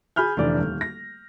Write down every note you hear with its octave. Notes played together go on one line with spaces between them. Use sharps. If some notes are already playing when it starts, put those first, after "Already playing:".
G#4 G#5 B5 F6 G6
F1 D3 E3 D5
D#1
A#6